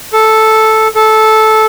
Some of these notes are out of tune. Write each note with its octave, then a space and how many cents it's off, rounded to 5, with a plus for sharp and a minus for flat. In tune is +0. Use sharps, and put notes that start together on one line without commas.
A4 -5
A4 -15